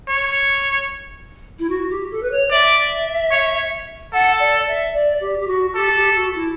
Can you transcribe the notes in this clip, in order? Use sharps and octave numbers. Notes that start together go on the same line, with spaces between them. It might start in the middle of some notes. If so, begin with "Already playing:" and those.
C#5
E4
F#4
G4
A4
B4
C#5
D5 E5
C#5
A4 F#5
D5
E5
D5
G4
G4
F#4
G4 A4
G4
F#4
E4